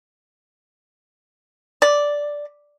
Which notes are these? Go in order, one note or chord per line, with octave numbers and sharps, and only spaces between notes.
D5